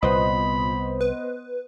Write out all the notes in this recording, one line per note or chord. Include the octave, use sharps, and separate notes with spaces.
C2 A#2 B3 C5 D#5 B5
B4